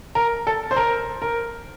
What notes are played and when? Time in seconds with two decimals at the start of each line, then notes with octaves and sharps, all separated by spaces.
0.15 A#4
0.47 A4
0.71 C5
0.76 A#4
1.22 A#4